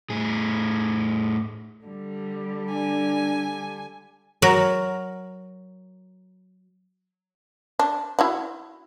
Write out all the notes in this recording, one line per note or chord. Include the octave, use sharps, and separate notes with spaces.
A2 G#4
D3 G3
D4 G#5
F#3 F#4 A#4
D4
E4 F#4 F#5